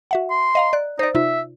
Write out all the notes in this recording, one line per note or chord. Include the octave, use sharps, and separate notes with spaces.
F#4 E5 F#5
C6
D#5 F5 A#5
D5 F#6
D#4 C5 D5
C3 D#4 F4 E5